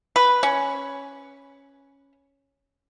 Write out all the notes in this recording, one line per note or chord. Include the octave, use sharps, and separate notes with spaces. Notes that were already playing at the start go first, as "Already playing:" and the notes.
B4
C#4